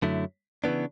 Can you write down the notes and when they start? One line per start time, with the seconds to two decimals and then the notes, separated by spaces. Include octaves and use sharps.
0.02 F#2 D3 F#3 A3 E4
0.64 C#3 E3 B3 D4